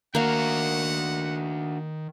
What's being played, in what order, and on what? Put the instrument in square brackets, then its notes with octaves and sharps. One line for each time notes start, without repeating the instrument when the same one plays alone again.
[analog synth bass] D#3 [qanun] A#3 F5 [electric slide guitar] D4 F#4 [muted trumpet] F#5